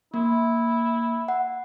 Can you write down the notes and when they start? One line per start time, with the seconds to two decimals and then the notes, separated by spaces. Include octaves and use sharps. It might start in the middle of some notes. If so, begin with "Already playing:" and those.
0.14 A#3 E4
1.28 F#5